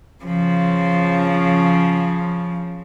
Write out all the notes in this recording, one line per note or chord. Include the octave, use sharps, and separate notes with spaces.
C#3 F3